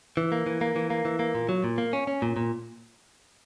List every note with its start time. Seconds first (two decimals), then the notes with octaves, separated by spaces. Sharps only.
0.17 E3
0.32 A#3
0.46 E3
0.61 A#3
0.76 E3
0.90 A#3
1.05 E3
1.19 A#3
1.35 A#2
1.49 F#3
1.64 A#2
1.78 A#3
1.93 C#4
2.07 C#4
2.22 A#2
2.37 A#2